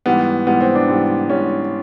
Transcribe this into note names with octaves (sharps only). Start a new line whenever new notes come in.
G#2 E3 G3 B3
G#2 E3 G3 B3
C4
D4
G#2 E3 G3
G#2 E3 G3 C#4